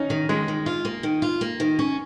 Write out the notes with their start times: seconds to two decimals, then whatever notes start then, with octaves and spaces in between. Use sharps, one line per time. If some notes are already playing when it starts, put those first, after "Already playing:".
Already playing: C#4 D#4
0.10 D#3
0.29 D#3 G#3
0.48 D#3
0.66 F4
0.85 A#3
1.03 D#3
1.22 F4
1.41 A#3
1.60 D#3
1.79 C#4